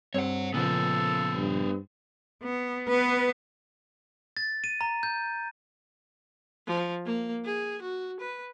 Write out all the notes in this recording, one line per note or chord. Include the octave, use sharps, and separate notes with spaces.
G2 C4 C#5 F#5
A#2 C#3 F3 B3 A4 C5
G2
B3
B3 B4
A6
D#7
A#5
G6
F3
A#3
G#4
F#4
B4